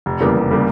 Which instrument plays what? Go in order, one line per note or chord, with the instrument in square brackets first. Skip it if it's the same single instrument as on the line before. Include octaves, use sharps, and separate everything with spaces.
[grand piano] F1
E2 C#3 G3 A#3
F1
C#3 G3 A#3